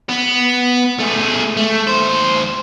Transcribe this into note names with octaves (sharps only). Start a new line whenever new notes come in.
B3
A3 G#4
A3
D#2 C5